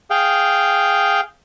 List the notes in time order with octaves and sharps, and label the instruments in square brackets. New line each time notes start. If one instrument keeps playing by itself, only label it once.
[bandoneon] G#4 F5 G5